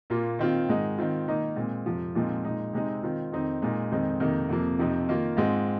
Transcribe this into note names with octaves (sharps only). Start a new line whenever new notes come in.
A#2 A#3 F4
D#3 C4 F4
G#2 D#3 G#3 D#4
D#3 C4 F4
D#3 A#3 D#4
A#2 G#3 C4
F2 C3 F3
A#2 F3 G#3 C4 D#4
A#2 G#3 D#4
C3 G#3 C4 D#4
D#3 C4 F4
F2 D#3 C4 D#4
A#2 G#3 D#4
F2 D#3 G#3 C4 D#4
F2 C3 D#3 A#3 D#4
F2 C3 F3 A#3
F2 C3 F3 C4 D#4
D#3 A#3 F4
G#2 G#3 C4 F4